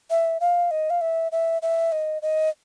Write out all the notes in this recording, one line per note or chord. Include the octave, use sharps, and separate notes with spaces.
E5
F5
D#5
F5
E5
E5
E5
D#5
D#5